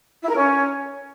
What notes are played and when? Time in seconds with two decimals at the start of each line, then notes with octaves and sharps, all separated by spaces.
0.24 E4
0.30 A#4
0.36 C#4